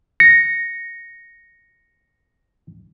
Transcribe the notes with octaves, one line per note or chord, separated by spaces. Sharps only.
A#6 C#7